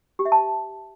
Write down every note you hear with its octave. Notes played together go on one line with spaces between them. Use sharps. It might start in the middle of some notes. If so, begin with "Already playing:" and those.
G4
E5
A5